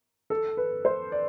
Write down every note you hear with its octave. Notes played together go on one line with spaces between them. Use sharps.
A4
B4
C5
D5